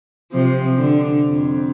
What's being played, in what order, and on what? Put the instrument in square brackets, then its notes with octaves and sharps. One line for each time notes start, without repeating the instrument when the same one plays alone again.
[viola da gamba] C3 F3
D3
F2